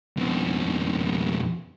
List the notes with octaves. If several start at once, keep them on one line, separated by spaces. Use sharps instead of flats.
F2 B2